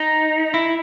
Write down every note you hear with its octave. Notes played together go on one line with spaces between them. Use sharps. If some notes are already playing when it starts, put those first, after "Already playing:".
Already playing: D#4
E4